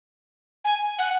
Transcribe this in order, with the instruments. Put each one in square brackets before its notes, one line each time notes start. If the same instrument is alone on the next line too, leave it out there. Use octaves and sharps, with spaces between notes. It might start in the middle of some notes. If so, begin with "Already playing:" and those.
[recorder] G#5
F#5